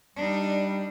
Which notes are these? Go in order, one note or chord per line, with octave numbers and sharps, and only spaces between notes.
G3 D4 D#4